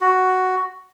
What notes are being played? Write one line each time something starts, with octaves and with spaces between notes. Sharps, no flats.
F#4